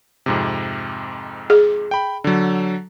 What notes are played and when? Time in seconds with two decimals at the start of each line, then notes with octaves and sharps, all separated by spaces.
0.26 F2 G#2 C3
1.50 G#4
1.91 G5 B5
2.24 D3 F#3